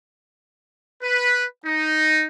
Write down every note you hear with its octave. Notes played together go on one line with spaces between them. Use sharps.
B4
D#4